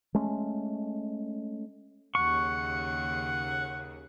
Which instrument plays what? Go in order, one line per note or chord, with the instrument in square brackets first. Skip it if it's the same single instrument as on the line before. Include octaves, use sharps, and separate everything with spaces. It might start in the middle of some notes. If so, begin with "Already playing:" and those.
[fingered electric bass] G#3 A3 C#4
[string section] D#2 C#3 [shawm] F#5 [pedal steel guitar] C#6